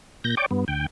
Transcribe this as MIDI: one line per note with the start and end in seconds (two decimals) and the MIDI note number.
0.24 0.35 46
0.24 0.35 91
0.24 0.35 94
0.37 0.46 73
0.37 0.46 74
0.37 0.46 79
0.37 0.46 86
0.51 0.64 43
0.51 0.64 59
0.68 0.86 38
0.68 0.86 79